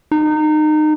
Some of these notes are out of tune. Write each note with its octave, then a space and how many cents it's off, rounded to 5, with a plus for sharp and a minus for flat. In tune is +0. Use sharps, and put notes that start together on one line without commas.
D#4 -25